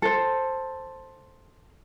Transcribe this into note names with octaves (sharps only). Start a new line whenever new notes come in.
A4 C5